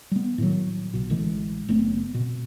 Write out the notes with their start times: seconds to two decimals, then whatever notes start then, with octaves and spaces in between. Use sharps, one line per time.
0.11 G3 B3
0.38 A2 D#3 F#3
0.93 B1 B2
1.10 A1 D3 E3 G#3
1.68 F#1 A3 B3 C4
2.14 B2